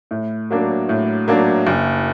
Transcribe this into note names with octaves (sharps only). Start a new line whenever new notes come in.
A2
F#3 A#3 D4
A2
F#3 A#3 D4
F#1